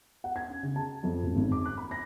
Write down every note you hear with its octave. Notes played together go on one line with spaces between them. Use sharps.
F#5
G#6
C#4
C#3
A5
F2
A1
G#1
D6
F#6
B5
A#6